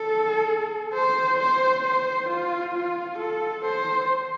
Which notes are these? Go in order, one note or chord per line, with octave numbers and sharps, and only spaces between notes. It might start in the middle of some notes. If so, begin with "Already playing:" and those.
Already playing: A4
C5
C5
C5
F4
F4
A4
C5